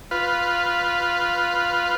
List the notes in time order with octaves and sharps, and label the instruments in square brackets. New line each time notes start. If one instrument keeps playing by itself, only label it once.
[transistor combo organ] F4 B4